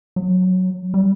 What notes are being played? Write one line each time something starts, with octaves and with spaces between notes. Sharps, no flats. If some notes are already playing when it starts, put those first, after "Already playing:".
F#3
G3